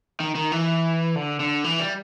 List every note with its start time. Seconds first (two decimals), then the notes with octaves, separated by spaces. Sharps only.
0.20 D#3
0.35 D#3
0.52 E3
1.16 D3
1.40 D3
1.64 E3
1.80 G3